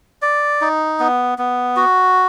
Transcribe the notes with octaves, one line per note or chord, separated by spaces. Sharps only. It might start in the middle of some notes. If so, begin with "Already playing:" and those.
D5
D#4
B3
B3
F#4